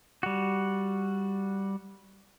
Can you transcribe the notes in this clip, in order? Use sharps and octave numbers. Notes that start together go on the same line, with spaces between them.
G3 F#4